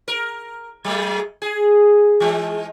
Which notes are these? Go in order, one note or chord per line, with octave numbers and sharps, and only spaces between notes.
A#4
F#3 G#3 A3
G#4
E3 G#3